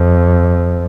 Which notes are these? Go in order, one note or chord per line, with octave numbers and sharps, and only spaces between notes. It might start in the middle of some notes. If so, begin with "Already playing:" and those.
Already playing: F2